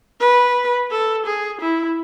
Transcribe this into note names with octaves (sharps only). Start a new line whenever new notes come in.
B4
A4
G#4
E4